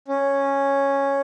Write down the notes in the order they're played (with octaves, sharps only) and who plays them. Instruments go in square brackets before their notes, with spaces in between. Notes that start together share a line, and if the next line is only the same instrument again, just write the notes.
[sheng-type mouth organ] C#4